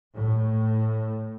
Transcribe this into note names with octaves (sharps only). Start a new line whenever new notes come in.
A2